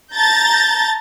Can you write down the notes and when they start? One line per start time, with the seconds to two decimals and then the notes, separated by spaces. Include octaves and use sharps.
0.15 A5 A#5 G6 A6 A#6